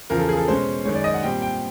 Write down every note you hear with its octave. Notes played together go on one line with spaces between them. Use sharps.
E2 C#3 F3 A#4
A4
G#4
A4
B2 G#3 C#4 C5
F#2 D#3 G#3 C#5
D5
D#5
F#5
A#2 G3 C4 G5
G5